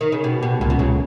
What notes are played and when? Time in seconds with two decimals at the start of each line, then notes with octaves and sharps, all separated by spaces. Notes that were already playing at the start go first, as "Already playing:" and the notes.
0.01 D#3
0.12 C#3
0.24 B2 G4
0.42 B2 G4
0.60 C#2 A#2
0.70 B2
0.79 C#2 C#3